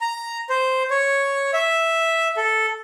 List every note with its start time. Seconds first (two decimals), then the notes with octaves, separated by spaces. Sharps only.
0.01 A#5
0.49 C5
0.90 C#5
1.53 E5
2.37 A4